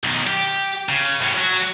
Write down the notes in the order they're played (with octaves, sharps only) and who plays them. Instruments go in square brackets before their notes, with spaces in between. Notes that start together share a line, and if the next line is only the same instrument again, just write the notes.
[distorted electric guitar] B1 D#3
G4
C#3
A2 C#4
F#3 F#4